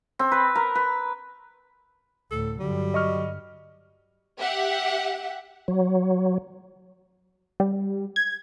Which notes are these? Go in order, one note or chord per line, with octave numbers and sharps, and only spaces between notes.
C4
B4
A#4
B4
D2 A2 A4
G2 D3 F#3 G3
D#5 C#6 F6
G4 E5 F#5
F#3
G3
G#6